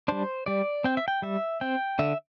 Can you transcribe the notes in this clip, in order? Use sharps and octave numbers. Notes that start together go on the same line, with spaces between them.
G3 D4 C5
G3 D5
C4 G5
E5
G5
G3 E5
C4 G5
D3 E5